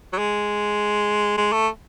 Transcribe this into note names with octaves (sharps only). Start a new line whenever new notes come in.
F#3
G#3
G#3
A3